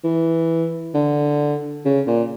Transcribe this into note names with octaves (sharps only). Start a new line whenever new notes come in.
E3
D3
C#3
A#2